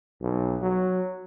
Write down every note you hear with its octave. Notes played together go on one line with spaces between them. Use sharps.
B1
F#3